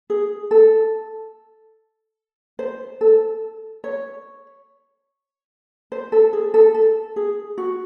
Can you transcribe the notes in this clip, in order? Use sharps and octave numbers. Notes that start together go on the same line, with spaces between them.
G#4
A4
C5
A4
C#5
C5
A4
G#4
A4
A4
G#4
F#4